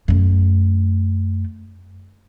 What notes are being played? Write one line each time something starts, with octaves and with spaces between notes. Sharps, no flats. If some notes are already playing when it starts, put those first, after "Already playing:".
F#2 A3